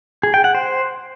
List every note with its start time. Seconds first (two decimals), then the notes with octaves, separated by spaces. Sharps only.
0.23 G#4
0.34 G5
0.44 F#5
0.55 C5